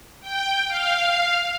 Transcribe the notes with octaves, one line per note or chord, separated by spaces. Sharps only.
G5
F5